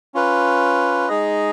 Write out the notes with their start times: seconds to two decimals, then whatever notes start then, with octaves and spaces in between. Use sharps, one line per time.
0.14 C#4 F4 B4
1.08 G#3 D#4 G#4 D#5